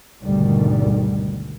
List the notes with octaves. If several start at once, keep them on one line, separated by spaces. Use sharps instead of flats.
G#1 D2 B2 D#3 G3